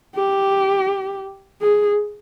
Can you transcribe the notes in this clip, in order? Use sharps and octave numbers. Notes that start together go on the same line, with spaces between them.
G4
G#4